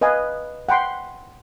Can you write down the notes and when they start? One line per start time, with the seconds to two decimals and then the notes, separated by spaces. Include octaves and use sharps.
0.01 B4 D#5 F5 G#5
0.69 F#5 G5 B5 C6